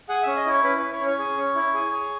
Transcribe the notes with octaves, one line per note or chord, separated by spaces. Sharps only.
G#4 F#5
C#4 E5
D#5
E4 C#5
C#4 B4
E4 B4
C#5
C#4
C#5
G#4
C#4
E4
G#4
G#4